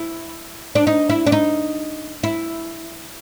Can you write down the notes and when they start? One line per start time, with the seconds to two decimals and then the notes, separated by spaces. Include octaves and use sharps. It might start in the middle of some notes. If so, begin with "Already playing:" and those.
Already playing: E4
0.75 D4
0.87 D#4
1.09 E4
1.26 D4
1.32 D#4
2.23 E4